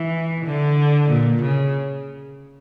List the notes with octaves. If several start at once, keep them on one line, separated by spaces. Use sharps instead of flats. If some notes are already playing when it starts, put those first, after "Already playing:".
Already playing: E3
D3
A#2
C#3